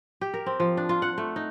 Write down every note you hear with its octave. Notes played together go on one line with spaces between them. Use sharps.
G4
A#4
C4
F3
D4
F4
F#5
A3
D#4